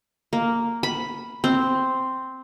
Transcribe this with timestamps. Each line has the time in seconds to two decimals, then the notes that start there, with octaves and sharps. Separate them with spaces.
0.33 A#3
0.83 B5
1.44 C4